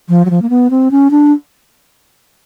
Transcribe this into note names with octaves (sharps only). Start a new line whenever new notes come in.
F3
F#3
F3
A#3
B3
C4
C#4
D4